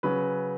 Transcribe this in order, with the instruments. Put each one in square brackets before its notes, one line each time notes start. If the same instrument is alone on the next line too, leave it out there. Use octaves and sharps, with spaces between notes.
[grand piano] C#3 F#3 B4